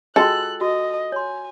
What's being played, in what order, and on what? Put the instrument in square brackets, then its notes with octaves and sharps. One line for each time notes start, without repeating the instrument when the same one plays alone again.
[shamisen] G#3 [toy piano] F4 F#4 G5 [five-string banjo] A4 [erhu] F#6
[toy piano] F#4 [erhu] D#5
[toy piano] C#5 C6 [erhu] G#5